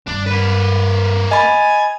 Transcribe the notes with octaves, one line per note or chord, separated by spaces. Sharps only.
G2 D4
A#3 B4
D#5 G#5 B5